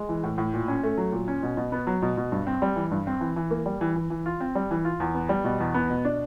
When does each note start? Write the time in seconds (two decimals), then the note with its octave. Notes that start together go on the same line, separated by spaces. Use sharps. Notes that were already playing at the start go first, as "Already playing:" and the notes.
Already playing: G#3
0.09 E3
0.23 A2
0.38 A2
0.54 A#2
0.68 C#4
0.83 A3
0.98 F#3
1.12 A#2
1.28 C#4
1.43 B2
1.57 B2
1.72 B3
1.87 F#3
2.02 B2
2.17 B2
2.32 G2
2.47 C4
2.62 G3
2.76 E3
2.91 G2
3.07 C4
3.21 E3
3.36 E3
3.51 A#3
3.66 G3
3.81 E3
3.96 E3
4.10 E3
4.26 F4
4.41 C4
4.55 G3
4.71 E3
4.85 F4
5.00 E2
5.15 B3
5.29 G3
5.44 B2
5.60 E2
5.74 B3
5.90 B2
6.05 D4